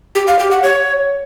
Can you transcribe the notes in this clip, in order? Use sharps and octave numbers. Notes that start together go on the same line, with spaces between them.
G4
F5
G4
F#5
C#5